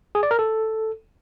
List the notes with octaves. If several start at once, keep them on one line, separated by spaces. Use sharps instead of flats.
G#4
D5
A#4
A4